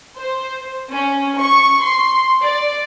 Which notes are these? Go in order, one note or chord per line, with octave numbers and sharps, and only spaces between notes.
C5
C#4
C#6
C6
D5